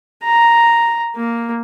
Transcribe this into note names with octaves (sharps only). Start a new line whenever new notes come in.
A#5
A#3